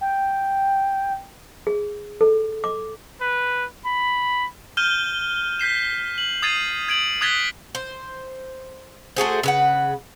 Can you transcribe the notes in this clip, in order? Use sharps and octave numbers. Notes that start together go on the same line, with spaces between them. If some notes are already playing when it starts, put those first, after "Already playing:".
G5
G#4
A4
D6
B4
B5
F6 G6 D#7 E7 G7
G6 B6 C7 E7
F#7
D#6 G#6 A6 C7 D#7
G#6 D7 F#7
D#6 F#6 G#6 A6 B6 G7
C5
A3 F#4 G#4 C5
C#3 B4 F#5